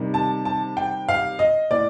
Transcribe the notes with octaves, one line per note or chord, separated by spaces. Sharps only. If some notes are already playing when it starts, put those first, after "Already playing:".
Already playing: C3 D#3 G3
A5
A5
G5
F5
D#5
A2 D5